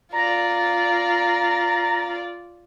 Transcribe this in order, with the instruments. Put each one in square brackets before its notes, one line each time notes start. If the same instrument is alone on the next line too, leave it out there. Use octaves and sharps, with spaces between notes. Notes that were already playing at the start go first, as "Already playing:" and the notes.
[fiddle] F4 D5 [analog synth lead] A#5